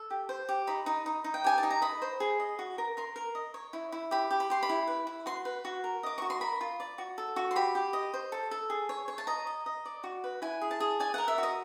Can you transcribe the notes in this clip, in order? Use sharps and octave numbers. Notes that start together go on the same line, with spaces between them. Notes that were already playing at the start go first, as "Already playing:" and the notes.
Already playing: A4
G4
C5
G4
D#4 B5
D#4
D#4
D#4
G5
G4 G#5
A5
D#4
A#5
D#5 B5
C5
G#4
D#5
F#4
A#4
A#4 C6
A#4
D#5
C#5
E4
E4
G4 B5
G4
B5
G4 C6
B5
E4
B4
E4
F#4 C6
B4
F#4
A#4
D#5 D6
F#4 C#6
C6
A#4 B5
F4
D5
F#4
A4
F#4
C6
G4 B5
G4
D#5
C5
A4
A4
G#4
C#5
C#5
A5
D#5 A#5
D#5
D#5
D5
F#4
B4
E4 G#5
G#4
A5
G#4
D5 G#5
A#4 F#5
E5
F#4
D#5